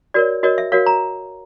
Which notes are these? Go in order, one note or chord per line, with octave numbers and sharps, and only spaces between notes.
F#4 A#4 C#5 D5
F#4 A#4 C#5 D#5
E5
F#4 A#4 C#5 F5
A#5